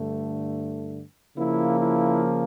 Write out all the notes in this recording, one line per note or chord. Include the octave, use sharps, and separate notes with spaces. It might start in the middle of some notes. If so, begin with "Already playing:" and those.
Already playing: G2 D3 A3
C#3 F3 A#3 E4
E4